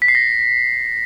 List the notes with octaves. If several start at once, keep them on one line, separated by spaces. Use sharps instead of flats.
B6
C7
A#6